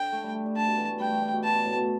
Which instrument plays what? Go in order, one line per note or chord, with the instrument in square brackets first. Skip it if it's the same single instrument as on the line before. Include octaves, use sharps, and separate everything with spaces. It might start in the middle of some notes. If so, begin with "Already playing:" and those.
Already playing: [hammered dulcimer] D3 [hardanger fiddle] G5
[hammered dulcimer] A3
G3
A3
G3
[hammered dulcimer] D3 [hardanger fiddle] A5
[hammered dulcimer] B2
E3
A3
[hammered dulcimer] G3 [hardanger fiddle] G5
[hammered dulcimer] A3
G3
B2
[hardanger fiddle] A5
[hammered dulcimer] B2
A2
B2